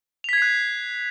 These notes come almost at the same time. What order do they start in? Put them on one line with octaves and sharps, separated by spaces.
F7 B6 G#6 C7 F#6